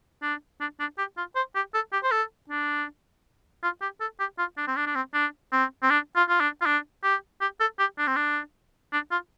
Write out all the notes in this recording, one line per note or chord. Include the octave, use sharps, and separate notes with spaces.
D4
D4
D4
G4
F4
C5
G4
A4
G4
C5
A4
D4
F4
G4
A4
G4
F4
D4
C4
D4
D4
C4
D4
C4
C4
D4
F4
F4
D4
F4
D4
G4
G4
A4
G4
D4
C4
D4
D4
F4